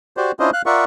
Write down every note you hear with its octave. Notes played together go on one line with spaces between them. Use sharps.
F#4 G4 C5 D5
C#4 D4 E4 F4 C5 D#5
F5 F#6
F4 A#4 D5 E5 F#5 C#6